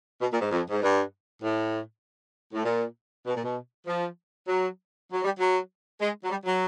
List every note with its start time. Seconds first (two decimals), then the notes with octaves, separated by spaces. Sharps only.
0.21 B2
0.31 A#2
0.41 G#2
0.51 F2
0.70 G#2
0.82 G2
1.42 A2
2.53 A2
2.65 A#2
3.26 B2
3.36 A#2
3.44 B2
3.87 F3
4.48 F#3
5.13 F#3
5.24 G3
5.39 F#3
6.01 G#3
6.24 F#3
6.31 G3
6.46 F#3